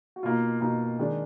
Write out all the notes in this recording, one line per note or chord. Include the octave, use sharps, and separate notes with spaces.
F#4
B2 A#3 D#4 F4
B2 A#3 D#4
D#3 G#3 D4